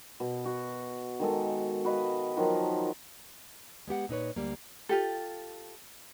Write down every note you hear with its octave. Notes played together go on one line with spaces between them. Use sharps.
B2
F#4
D#3 G#3 A4
F#4 B4 D#5 F5
D#3 F3 F#3
G#3 B3 G4 F#5
A#2 D#4 B4 C#5
D2 G3 A#3
F4 G4 A4